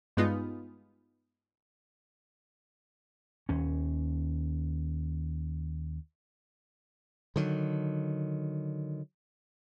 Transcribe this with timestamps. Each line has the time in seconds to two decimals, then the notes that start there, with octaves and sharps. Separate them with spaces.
0.17 G2 G#3 B3 D#4 F4
3.49 D#2 C#4
7.36 D3 D#3 F#3